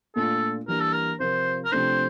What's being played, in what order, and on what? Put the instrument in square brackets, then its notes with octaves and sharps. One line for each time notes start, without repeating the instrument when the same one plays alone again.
[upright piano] A#2 A3 D4 F4 [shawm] A4
[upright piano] E3 G3 A#3 D4 G4 [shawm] A#4
[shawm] A4
A#4
[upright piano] C3 F3 C4 F4 A#4 [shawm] C5
[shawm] A#4
[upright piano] C3 F3 A3 D4 [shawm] C5